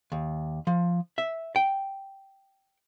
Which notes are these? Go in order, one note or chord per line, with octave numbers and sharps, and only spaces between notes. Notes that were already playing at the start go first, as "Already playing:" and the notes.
D#2
F3
E5
G5